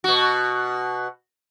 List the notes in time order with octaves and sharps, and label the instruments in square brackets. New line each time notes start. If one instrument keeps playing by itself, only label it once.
[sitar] B2 F#4